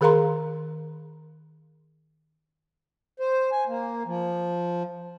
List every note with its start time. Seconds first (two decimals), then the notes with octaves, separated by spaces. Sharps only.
0.01 D#3 G#4 A#4 F5 A#5 C6
3.20 C5
3.52 G#5
3.67 A#3
4.06 F3